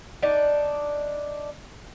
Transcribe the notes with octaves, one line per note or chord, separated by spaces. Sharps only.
D4 D#4 D5